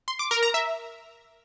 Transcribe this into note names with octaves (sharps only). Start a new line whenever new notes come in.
C6
D6
A#4
A#5
E5